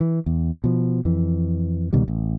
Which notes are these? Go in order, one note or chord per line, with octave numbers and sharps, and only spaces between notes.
E3
E2
B2 F3
F2 E3
C#2 B2 D#3 G3
A1